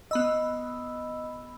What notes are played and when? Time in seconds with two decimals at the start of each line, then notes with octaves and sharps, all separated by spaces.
0.11 B3 D#5 B5 E6